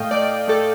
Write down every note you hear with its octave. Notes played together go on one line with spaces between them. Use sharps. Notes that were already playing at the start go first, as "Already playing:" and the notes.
Already playing: A2 A3 D#5 F5 G5
A3 D5
A3 A4